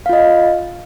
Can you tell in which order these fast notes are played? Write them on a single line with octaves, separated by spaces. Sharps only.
F5 F4 D#5